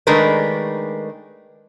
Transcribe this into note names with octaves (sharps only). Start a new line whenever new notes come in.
D#3 G#3 A3 D4 A#4 B4